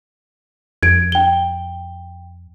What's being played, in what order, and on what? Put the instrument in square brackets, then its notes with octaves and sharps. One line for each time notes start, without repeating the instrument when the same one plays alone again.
[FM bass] F2 [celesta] G#6 D7
[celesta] G5 G7